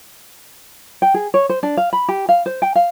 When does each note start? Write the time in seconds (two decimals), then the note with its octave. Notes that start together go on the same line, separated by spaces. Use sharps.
1.02 G5
1.14 G#4
1.34 C#5
1.49 C5
1.63 D4
1.77 F5
1.93 B5
2.08 G4
2.29 F5
2.46 C5
2.62 G5
2.75 F5